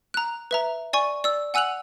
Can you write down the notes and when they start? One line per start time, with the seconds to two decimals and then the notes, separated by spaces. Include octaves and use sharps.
0.14 A#5 F#6
0.51 B4 E5 A#5
0.93 D5 G#5 C#6
1.24 D5 E6
1.54 F#5 G#5 E6 F#6 F7 F#7